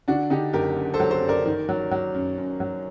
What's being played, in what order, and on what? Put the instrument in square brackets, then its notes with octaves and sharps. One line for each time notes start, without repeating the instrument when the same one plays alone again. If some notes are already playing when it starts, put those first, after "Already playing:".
[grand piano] D3 D4 F#4
D3 D#4 G4
F#1 G4 A#4
F#2
A4 C5
F#3
A4 C5
F#2
A#4 D5
D#3
F#3
F#3
F#2
F#2
F#3